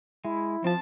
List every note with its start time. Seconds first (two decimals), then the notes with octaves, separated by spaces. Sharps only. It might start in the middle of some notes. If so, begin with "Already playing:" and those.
0.25 G#3 E4
0.64 F3 C4 A5